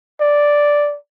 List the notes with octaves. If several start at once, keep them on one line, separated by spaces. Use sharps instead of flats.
D5